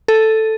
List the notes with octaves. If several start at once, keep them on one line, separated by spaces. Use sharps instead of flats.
A4